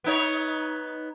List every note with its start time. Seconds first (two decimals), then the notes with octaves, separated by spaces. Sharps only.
0.04 B3 D#4 C#5